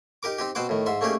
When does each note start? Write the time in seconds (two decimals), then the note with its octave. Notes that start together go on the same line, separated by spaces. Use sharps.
0.23 D#4 G4 A#4 D6
0.39 C4 D#4 G4
0.55 B2 C4 C5 F#5 D6
0.69 A2 D#3
0.86 G#2 E5 C6
1.01 A3 A#3 C#4 D#4 G4 G#4